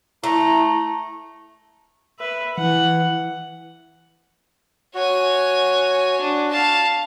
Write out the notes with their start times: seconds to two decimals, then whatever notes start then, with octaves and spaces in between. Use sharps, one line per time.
0.24 A3 E4 A#5
2.19 B4 E5
2.58 E3 F#5
4.95 F#4 C#5 G#5
6.20 D4
6.50 F5 A5